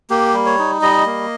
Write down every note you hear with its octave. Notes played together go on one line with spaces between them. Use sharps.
A#3 G4
G3
C#5
D#4
G3 D#5
A#3